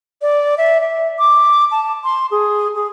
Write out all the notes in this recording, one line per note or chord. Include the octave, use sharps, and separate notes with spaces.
D5
E5
E5
D6
A5
C6
G#4
G#4